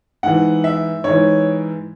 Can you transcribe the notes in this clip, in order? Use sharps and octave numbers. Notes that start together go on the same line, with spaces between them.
G#2 E3 F#5
E5
G#2 E3 C#5